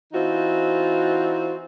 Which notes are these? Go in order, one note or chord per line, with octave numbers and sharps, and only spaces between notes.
E3 C4 D#4 F4 F#4